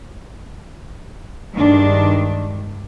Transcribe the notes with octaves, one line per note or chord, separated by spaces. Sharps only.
G2 D#3 G#3 D4